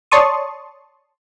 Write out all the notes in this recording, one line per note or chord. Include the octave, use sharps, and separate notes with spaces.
C#5 D5 A5 C6 C#6 D#6